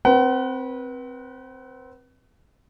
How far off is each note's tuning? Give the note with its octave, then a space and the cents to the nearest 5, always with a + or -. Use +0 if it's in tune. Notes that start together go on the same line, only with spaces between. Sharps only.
C4 +0 B4 -25 F#5 +35